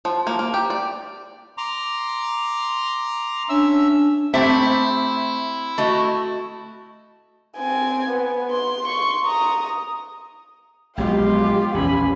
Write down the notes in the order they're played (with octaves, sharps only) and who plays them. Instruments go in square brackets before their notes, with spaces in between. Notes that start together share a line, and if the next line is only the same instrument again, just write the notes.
[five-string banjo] F3
A#3
A#3
G4
D5
[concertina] A#5 C6 D6
[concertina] C#4 E5 E6 [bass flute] D4
[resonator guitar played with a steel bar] A3 G4 E5 [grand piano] C4 [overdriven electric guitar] E4
[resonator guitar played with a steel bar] A3 F#4 D#5
[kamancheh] C4 G#5
B3
C6
C6 C#6
A#5 D#6
[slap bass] A#1 F#3 B3 [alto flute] G#3 [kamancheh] F4 G5 [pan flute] G4
[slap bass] A#1 E2 [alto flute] C#4 [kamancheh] G#5 B5